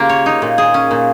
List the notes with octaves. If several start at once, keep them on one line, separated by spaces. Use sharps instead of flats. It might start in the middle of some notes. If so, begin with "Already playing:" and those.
Already playing: C#3 A#3 F4 G4
C#5
D#4
A#2
G#4
C#4
A#2